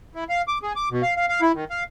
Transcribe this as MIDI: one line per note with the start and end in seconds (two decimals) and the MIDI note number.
0.15 0.24 64
0.29 0.42 77
0.48 0.58 86
0.63 0.73 68
0.76 0.89 86
0.91 1.02 47
1.03 1.14 77
1.17 1.26 77
1.29 1.41 77
1.42 1.52 64
1.54 1.64 51
1.70 1.84 77